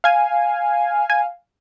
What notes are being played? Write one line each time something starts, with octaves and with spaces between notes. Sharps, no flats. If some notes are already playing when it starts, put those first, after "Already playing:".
F5 G#5
G#5